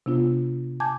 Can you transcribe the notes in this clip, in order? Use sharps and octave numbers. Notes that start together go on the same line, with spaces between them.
C3 B3 D4 F4
G#5 A5 D6 G6 G#6